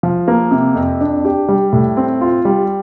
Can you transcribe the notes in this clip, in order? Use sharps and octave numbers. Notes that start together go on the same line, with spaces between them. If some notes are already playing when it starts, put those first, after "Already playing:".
F3
A#3
C3
F2
D4
G4
G3
A2
C4
F4
G3